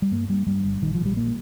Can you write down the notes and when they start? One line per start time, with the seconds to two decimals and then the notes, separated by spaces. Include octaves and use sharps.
0.02 G3
0.11 G2 A#3
0.29 G2 G3
0.47 G2 G3
0.64 G1
0.81 A#1 D#3
0.95 F3
1.00 A#1
1.05 G3
1.16 A#2 A#3